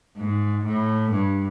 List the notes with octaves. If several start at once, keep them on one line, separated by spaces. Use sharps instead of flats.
G#2
A2
G2